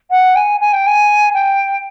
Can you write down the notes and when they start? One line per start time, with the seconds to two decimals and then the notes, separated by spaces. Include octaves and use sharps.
0.10 F#5
0.35 G#5
0.60 G#5
0.73 G5
0.86 G#5
1.34 G5